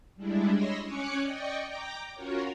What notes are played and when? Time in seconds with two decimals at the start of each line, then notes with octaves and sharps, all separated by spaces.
0.16 G3 G#3 D4 E4
0.52 C#5 D#5 B5 C6 E6 A#6
0.84 C#4 C#5 G#5 D6 F#6 C#7
1.22 D5 D#5 G5 C#6
1.64 G5 A#5 D6
2.14 C#4 F4 F#4 A#4 C#5